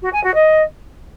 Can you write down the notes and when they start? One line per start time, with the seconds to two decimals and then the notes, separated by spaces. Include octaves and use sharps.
0.02 F#4
0.13 G#5
0.23 F#4
0.34 D#5